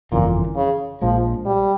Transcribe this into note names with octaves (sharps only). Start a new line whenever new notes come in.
G1 F2 A#2 C#3 E3
C#3
A#1 A#2 F3 G#3
G3